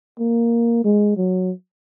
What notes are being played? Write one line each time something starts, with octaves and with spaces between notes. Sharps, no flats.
A#3
G#3
F#3